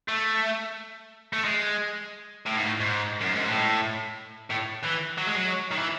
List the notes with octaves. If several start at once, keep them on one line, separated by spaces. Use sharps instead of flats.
A3
A3
G#3
A2
G#2
A2
G#2
F#2
G#2
A2
A2
E3
F#3
G#3
F#3
D#3
E3